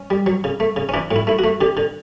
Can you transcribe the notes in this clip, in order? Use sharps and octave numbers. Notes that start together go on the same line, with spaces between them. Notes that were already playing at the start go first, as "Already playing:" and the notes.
Already playing: C#4
G3
F#3
C#3
A3
C#3
C#4
E3 D4
A2
E4
A3 E4
F#4
A3
D3 G4
D3